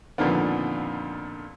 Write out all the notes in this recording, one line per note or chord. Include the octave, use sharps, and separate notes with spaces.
F2 A#2 D3 D#3 F3 B3